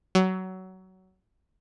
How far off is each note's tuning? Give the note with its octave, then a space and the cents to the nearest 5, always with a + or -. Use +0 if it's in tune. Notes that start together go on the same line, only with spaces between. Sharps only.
F#3 +20